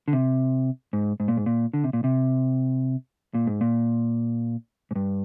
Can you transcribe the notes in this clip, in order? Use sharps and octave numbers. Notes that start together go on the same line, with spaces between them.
D3
C3
G#2
G#2
A#2
G#2
A#2
D3
C3
A#2
C3
A#2
G#2
A#2
G#2
G2